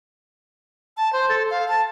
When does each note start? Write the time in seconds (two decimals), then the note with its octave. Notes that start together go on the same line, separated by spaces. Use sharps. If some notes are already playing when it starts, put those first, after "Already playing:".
0.97 A5
1.13 C5
1.29 A4
1.50 F5
1.68 A5